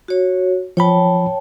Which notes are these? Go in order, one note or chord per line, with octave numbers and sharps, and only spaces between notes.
F#4 C#5
F3 C#5 G5 A5 B5